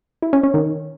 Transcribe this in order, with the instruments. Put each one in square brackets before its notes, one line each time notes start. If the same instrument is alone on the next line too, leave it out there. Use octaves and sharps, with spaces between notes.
[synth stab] E4
C#4
C#4
D#3